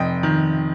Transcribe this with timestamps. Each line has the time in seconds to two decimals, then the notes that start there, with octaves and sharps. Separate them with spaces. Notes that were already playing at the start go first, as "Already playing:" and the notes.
Already playing: F1 D#5 G5
0.23 D#3